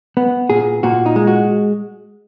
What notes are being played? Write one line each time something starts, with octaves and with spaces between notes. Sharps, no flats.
B3
A#2 G#4
A#2 F#4
D#4
G#3
F#4